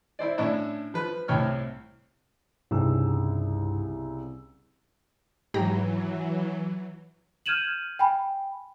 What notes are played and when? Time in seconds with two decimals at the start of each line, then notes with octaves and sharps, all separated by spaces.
0.19 E4 C5 D5
0.38 A2 C#4 D4 E4
0.94 F3 B4
1.28 C2 A2 C#5 G5 F6
2.71 C2 G2 C#3 D#4 E6
5.54 G#2 E3 F#3 G4 A#5
7.46 F6 G6 G#6 D#7 E7 F#7
7.99 G5 G#5 B5